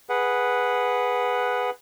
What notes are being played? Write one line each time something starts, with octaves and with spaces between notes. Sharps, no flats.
G#4 B4 F#5